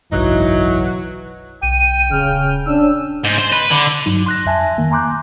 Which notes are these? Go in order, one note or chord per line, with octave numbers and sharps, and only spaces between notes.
F#1 B1 G#2 E3 F#3 D#4
B1 G5 D#7
D#1 C#3 F6
C#4 D4 E6
G#2
C5
B4
D3
G2 F#3 D#4
C6 F#6 A#6
F2 E5 G#5 A5 A#6
D#3 A#3
G#5 A#5 C6 D6 F#6 G6